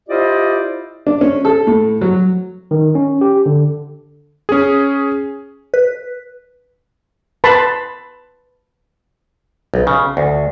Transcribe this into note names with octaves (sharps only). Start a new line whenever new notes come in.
E4 F4 G4 C5 D5 D#5
D4
C#4
A4
A2
F#3
D#3
C#4
G4
D3
C#4 G#4
B4
B4 A5 B5 C6
B1
C#3
D2